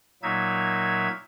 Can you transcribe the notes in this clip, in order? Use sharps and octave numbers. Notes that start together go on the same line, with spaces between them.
A#2 F#3 A#3 D#4 E5 G#6